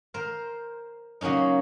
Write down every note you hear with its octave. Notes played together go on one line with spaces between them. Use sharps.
A#4 C5
C#3 F#3 A#3 C#4 D#4